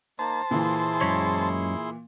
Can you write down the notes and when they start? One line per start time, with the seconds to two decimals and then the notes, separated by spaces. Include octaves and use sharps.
0.19 A#3 D#4 C5 A5
0.51 A#2 E3 E4 G#4 C6
1.01 F#2 G#3 C#5